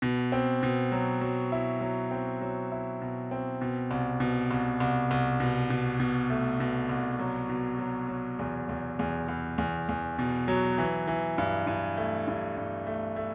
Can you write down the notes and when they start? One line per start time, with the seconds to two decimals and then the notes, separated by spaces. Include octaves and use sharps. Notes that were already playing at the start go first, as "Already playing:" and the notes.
0.02 B2
0.32 C4
0.63 B2
0.92 F#3
1.21 F#3
1.52 E4
1.81 F#3
2.11 C4
2.41 F#3
2.72 E4
3.01 B2
3.31 C4
3.61 B2
3.91 C2
4.20 B2
4.51 C2
4.80 C2
5.11 C2
5.40 B2
5.70 B2
6.00 B2
6.30 A3
6.60 B2
6.89 C2
7.19 F#3
7.49 B2
7.79 F#3
8.08 F#3
8.39 E2
8.69 E2
8.99 E2
9.28 E2
9.58 E2
9.89 E2
10.18 B2
10.48 F#3
10.78 E3
11.07 E3
11.38 G2
11.67 G2
11.97 A3
12.28 G2
12.57 G2
12.87 A3
13.16 A3